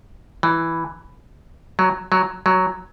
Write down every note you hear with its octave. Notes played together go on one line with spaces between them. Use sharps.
E3
F#3
F#3
F#3